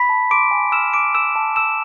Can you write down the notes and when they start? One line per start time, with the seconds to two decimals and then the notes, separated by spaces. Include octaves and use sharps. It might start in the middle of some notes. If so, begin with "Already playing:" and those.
Already playing: B5 B6
0.09 A5
0.31 C6 D6 D7
0.51 G#5
0.72 E6 F6 E7
0.94 B5 D6 D7
1.15 E6 E7
1.36 A5
1.56 E6 E7